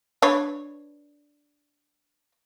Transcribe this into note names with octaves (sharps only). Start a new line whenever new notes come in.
D4 B4 C#5